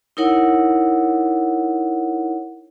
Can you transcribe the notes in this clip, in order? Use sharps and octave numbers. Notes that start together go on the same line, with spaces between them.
D#4 E4 A#4 C#5 F#5